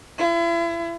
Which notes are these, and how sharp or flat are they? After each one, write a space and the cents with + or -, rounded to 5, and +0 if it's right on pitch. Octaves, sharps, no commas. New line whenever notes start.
E4 +40